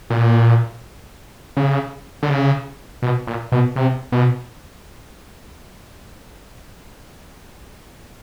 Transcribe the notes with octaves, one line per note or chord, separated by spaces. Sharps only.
A#2
C#3
D3
C#3
B2
A#2
B2
C3
B2